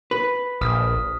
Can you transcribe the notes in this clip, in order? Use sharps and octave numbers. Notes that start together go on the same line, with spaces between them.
B4 B6
A#1 D#6 F6